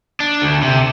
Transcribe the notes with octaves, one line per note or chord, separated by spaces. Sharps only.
D4
D2
C3